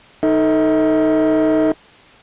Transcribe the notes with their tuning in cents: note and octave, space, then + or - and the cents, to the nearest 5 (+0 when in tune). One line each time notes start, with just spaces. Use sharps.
D#4 +0 A4 +20 D#5 +45